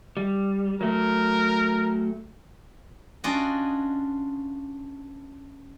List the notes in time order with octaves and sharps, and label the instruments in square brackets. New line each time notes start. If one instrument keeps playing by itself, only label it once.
[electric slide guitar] G3
[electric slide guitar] F#3 A3 [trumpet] A#4
[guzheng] C#4 D4 F4 F#4 D5 D#5